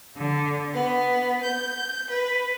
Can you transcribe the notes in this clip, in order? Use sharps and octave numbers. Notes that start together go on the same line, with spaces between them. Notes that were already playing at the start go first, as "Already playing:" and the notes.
D3
B3
G6
B4